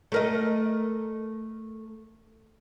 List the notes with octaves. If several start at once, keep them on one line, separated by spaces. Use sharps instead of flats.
A3 A#4 D#5